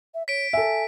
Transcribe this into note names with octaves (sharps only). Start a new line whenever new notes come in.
E5
C#5 B6 D7
A4 E5 G#5